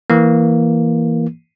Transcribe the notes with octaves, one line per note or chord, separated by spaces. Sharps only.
E3 A#3